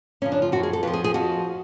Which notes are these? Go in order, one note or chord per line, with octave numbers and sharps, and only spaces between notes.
F#2 C#3 F3 C#4
D4
F4
F#2 F3 F#4
G#4
A4
F2 F3 B4
G#4
G#4
F2 F3 F#4